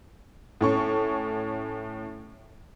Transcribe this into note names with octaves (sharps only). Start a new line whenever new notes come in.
A2 C#4 C#6